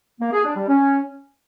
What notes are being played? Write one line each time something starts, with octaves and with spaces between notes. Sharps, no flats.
A#3
G#4
D4
G3
C#4